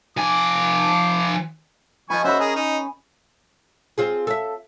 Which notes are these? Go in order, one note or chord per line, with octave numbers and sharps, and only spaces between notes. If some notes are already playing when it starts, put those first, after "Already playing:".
F3 G#5 D6
F3 D#5 G#5 B5 C#6
C#4 F#4 C5 C#5 E5 B5
G#4 A#4
D#4
C4 F4 G#4
A4 E5